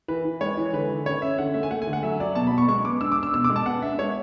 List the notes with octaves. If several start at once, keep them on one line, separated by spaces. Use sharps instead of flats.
E3 B4
E3
G#3 C#5
E3
D3 B4
D3
C#4 C#5
C#4 E5
D3 F#5
A3 E5
G#5
A3 F#5
G#5
D3
F#5
F#3 E5
F#3 D5
B2 A5
B5
B2
C#6
G#3 C#6
B3 D6
D4 E6
D6
D4
E6
B2 E6
D6
G#3
A5
B3 F#5
D4 E5
G#3 C#5